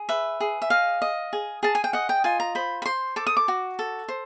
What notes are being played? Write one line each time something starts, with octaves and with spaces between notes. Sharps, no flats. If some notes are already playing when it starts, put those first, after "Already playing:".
Already playing: G#4
B4 E5
G#4
E5
D#5 F5
D#5
G#4
G#4 A5
G#5
G5
D#5 F#5
G5
F4 G#5
A#5
C5 B5
B5
C5 C6
A4 D6
D#6
D6
F#4
A4
C5